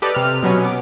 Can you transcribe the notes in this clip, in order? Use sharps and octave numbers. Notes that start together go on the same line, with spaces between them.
G4 A4 B4 D5 D#5
C3 F6
B2 F#3 B3 C#4
B3 D6